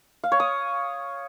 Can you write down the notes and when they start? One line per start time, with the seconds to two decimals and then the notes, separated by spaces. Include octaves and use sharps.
0.24 F5
0.32 C#5
0.40 D#6